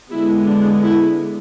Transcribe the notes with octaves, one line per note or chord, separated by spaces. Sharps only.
D3 G#3 B3 E4
D4
E4